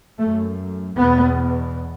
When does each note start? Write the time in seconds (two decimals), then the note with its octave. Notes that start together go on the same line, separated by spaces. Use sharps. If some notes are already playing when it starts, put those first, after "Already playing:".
0.18 F#2 A3
0.97 E2 B2 B3